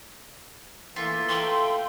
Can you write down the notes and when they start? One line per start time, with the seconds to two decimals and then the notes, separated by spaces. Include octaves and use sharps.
0.96 E3 A3 A#3 F4 E5
1.29 A4 G5 C6